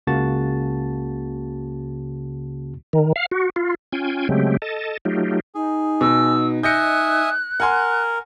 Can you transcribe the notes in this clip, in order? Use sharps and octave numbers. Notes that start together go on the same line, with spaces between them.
C#2 C#3 A#3 F#4 A5 A6
D#3
F5
F#4
F4
C#4 F4 G5 G#5
C#3 F#3 G#3 A3 C4 G4
A4 D#5 A5
F#3 A3 D#4 F4 G4
D#4 G#4
B2 E6
D#5 E5 G#5 F#6 G6 A#6 C#7
A#4 F#5 G#5 C6